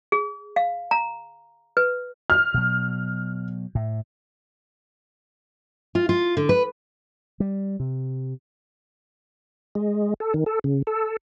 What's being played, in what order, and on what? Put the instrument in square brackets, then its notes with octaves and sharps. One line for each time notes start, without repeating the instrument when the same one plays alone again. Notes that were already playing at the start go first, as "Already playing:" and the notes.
[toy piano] G#4
F5
A#5
B4
[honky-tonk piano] F6
[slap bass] B2 F#3
A2
[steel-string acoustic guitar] F4
F4
D3
B4
[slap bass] G3
C3
[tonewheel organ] G#3
A4
D#3
A4
C#3
A4